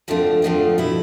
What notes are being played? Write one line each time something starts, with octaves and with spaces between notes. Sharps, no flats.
F2 D3 F3 A3 C4
F2 D3 F3 A3 C4
B2 A3 E4